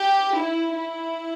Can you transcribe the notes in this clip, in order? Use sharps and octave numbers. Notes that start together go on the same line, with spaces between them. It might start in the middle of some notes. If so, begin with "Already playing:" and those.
Already playing: G4
E4
E4